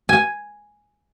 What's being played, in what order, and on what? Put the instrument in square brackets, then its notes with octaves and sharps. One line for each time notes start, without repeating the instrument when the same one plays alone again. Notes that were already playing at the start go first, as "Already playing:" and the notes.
[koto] G#5